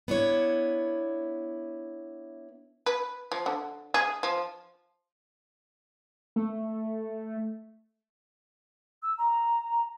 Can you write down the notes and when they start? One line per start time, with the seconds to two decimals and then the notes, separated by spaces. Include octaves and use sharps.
0.08 B3 D4 E4 C#5
2.86 B4
3.32 F3
3.46 D3
3.94 G#4
4.23 F3
6.36 A3
9.03 E6
9.18 A#5